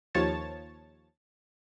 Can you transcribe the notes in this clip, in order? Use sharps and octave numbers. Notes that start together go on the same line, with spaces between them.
D#2 F3 C#5 A5 A6